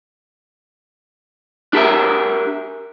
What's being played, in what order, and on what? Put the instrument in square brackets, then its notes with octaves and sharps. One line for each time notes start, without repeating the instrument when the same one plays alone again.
[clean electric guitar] D4 G4 A#4 E5